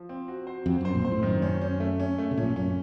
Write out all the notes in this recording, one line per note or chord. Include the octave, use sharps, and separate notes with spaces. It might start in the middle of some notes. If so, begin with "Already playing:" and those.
Already playing: F3
C4
F#4
C5
F2 C4
F#2 C5
A#1 A#2
C5
A2
F#2 D#3
C#4
C#4
A3
C#4
A3
C3
A#1 A#2 C#4
F#2 C#4